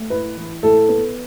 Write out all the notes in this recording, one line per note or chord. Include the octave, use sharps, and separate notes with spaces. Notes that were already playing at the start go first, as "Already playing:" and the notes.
Already playing: A3
A2 B4
E3
A2 A4
B3